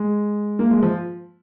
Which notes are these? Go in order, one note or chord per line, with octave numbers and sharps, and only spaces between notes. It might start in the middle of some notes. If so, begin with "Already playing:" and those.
Already playing: G#3
A#3
G#3
F3